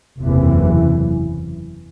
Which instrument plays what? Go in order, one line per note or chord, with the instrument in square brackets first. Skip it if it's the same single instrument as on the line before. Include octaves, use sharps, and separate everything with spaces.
[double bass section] F#1 E2 C3 E3